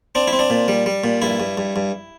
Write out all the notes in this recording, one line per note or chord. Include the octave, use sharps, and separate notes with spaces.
C4 D4
E4
C4
D4
A#2
G3
G3
A#2
G2 E4
G2
G2
G2